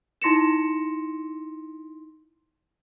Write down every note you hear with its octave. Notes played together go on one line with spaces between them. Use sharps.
D#4 E4 C6 A#6 C#7 E7